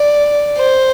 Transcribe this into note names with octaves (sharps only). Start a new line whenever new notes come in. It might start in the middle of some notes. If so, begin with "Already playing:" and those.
Already playing: D5
C5